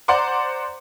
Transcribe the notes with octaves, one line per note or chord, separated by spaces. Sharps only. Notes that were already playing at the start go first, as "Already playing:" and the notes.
C5 D5 F#5 A#5 C6 D6